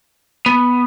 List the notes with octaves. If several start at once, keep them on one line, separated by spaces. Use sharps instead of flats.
B3